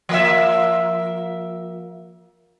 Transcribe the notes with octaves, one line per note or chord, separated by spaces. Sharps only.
F3 A#3 E5